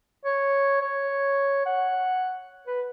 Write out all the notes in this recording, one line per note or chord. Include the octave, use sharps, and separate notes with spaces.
C#5
C#5
F#5
B4